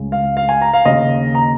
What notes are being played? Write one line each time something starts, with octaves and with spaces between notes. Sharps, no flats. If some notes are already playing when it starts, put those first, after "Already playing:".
Already playing: C#2 C#3
F5
F5
G#5
A#5
F5
D#2 C#3 D#5
A#5